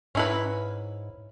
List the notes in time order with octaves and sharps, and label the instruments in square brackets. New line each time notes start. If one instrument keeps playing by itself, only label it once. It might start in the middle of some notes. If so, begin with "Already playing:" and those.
[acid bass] G#2 [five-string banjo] C#4 E4 B4